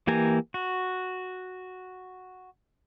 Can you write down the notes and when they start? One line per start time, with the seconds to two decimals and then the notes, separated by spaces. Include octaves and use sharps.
0.07 E3 A#3 G4 G#5 A#5
0.54 F#4